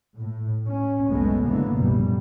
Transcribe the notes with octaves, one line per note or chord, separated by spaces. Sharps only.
A2
C#4
F#1 C2 A2 G#3 A3 B3
A2 D3 E3 A#3 B3
A#1 F#2 C3 G3